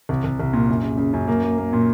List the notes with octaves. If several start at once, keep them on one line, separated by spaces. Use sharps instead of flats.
C2
C2
C2
A#2
F#2
C#3
C#3
F#2
A#3
A#3
A#3
A#2